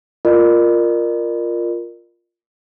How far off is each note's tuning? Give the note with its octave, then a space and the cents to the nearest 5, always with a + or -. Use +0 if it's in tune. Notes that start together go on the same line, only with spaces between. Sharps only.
F4 +0 A#4 +0 D5 +45